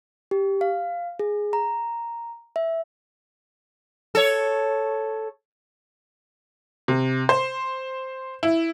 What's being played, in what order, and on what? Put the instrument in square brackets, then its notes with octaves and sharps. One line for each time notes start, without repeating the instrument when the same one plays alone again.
[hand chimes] G4
F5
G#4
A#5
E5
[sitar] A4 C#5
[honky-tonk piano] C3
C5
E4